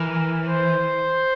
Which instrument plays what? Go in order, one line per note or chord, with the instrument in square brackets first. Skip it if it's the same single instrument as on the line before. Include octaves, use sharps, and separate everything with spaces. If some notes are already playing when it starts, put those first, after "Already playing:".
Already playing: [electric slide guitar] E3 [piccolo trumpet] A#4
[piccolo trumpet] C5